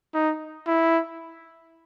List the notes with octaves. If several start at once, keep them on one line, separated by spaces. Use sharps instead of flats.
D#4
E4